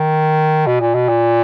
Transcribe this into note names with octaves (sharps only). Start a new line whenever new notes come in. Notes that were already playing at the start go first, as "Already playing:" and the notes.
Already playing: D#3
B2
A#2
B2
A#2